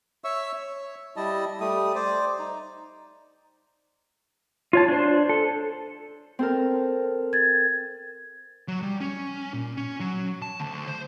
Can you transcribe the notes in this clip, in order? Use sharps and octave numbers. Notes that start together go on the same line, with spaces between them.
C#5 E5 C#6 E6
C#5
G3 E4 D#5 A5
G3 A3 D#6
C5 D5
D#4
F4 C#5 A5
D4 C5
A4
C4 A4 A#4
G#6 A6
F#3
G3
C#4
A#2
C#4
F#3
A5
D2
C5